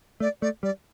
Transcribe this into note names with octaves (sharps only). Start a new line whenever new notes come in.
A3 D5
A3 D5
G3 D5